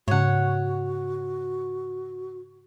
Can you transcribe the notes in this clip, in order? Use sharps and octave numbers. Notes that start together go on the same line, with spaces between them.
G#2 C#3 F#4 C#5 F#5